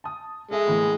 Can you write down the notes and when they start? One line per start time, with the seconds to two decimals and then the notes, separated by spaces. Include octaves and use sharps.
0.04 A5 D#6
0.51 G#3 A4 E5
0.67 A2 E3 A#3